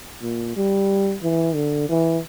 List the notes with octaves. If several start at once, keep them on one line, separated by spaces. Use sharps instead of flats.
A#2
G3
E3
D3
E3